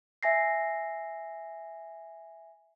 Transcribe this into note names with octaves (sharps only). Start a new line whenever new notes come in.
E5 G#5 A#6 C7